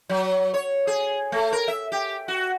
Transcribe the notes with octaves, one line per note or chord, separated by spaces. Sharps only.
F#3
C#5
G#4
A3
A#4
E5
G4
F#4